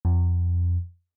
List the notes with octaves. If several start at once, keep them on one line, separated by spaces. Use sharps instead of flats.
F2